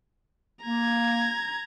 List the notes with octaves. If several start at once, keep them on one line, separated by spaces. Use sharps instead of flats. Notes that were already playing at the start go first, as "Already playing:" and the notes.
A#3 A#5 G#6